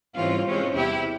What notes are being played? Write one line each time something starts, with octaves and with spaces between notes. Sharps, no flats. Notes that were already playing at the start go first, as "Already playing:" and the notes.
G#2 E3 G3 C4 C#4 F4
C3 E3 G#3 C4 C#4
E2 C3 G3 E4 G4